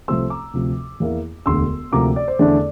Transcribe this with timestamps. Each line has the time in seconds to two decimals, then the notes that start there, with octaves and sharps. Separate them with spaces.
0.08 C2 C3 F3 A3 C4 C6 E6
0.30 A#5 D6
0.53 D2 C3 F3
1.00 E2 E3 A#3 E4
1.46 E1 D2 D3 C6 E6
1.92 D2 C3 F3 A#3 A#5 D6
2.16 D5
2.28 C5
2.39 E2 D3 A3 D4 D5